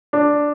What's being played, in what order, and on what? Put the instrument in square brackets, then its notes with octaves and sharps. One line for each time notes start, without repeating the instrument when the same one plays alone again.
[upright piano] D4